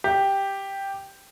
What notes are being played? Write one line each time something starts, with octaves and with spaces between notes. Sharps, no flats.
G4